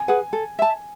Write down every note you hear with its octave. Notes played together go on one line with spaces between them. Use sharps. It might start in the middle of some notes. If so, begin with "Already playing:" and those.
Already playing: G#5
G#4 B4 F#5
A4
E5 A5